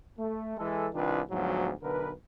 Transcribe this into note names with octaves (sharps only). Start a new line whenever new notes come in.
A3
E3 G#3 A4
C2 D#3 D4 F4 B4
D2 G#2 F3 F#3 B3
B1 D3 A#4 B4